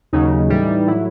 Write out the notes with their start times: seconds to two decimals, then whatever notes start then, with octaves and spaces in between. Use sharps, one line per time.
0.13 D#2 C#3 F#3 D#4
0.50 A2 E3 G3
0.87 A2 F#3 E4